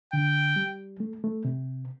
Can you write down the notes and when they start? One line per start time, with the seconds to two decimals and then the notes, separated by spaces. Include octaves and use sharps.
0.13 D3 G5
0.56 G3
1.00 A3
1.24 A3
1.45 C3